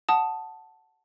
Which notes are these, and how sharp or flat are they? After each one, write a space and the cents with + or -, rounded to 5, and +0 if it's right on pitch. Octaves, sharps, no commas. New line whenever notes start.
F#5 +0 A5 +0 D#6 +0